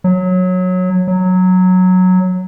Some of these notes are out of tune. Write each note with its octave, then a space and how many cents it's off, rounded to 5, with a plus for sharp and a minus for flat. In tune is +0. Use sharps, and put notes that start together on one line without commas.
F#3 -15
F#3 -5